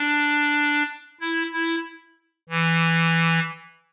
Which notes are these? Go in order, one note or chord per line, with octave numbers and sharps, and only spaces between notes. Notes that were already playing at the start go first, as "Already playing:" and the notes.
Already playing: D4
E4
E4
E3